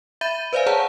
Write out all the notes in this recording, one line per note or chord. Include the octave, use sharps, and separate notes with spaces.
E5 B5 G6 D#7
B4 C5 D5 E5 F5 G#5
G#4 C5 C#5 F#5 A5 A#5